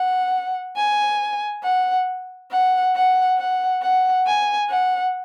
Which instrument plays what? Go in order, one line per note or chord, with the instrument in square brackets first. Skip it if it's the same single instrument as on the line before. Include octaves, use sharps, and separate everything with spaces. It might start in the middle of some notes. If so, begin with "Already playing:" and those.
Already playing: [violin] F#5
G#5
F#5
F#5
F#5
F#5
F#5
G#5
F#5